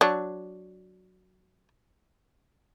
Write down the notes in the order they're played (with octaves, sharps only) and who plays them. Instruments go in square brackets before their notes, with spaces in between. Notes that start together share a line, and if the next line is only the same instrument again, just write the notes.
[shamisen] F#3 D4